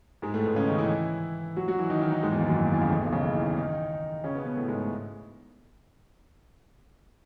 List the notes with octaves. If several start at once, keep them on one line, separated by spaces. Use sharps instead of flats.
G#2 G#3
A2 A3
B2 B3
C#3 C#4
D#3 D#4
E3 E4
F#3 F#4
F#3 F#4
E3 E4
D#3 D#4
D#3 D#4
D#3 D#4
G#2 G#3
E2 E3
D#2 D#3
F#2 F#3
E2 E3
D#2 D#3
E2 E3
C#2 C#3
A1 A2
B1 B2
C#2 C#3
D#2 D#3
E2 E3
E2 E3
D#3 D#4
C#3 C#4
B2 B3
B2 B3
A2 A3
G#2 G#3
A2